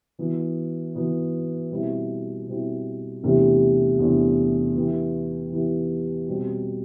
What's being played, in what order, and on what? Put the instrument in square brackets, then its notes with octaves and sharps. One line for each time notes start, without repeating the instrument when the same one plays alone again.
[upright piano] E3 B3 F#4
E3 B3 F#4
B2 G3 C4 E4
B2 G3 C4 E4
E2 C3 E3 A3 D4
E2 C3 E3 A3 D4
E3 B3 E4 G4
E3 B3 E4 G4
B2 G3 C4